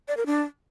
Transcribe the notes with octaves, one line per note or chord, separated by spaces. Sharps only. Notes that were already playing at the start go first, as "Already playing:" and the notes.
D5
A#4
D4